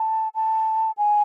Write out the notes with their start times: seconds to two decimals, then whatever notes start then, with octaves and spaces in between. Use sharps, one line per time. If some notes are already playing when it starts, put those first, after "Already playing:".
Already playing: A5
0.35 A5
0.97 G#5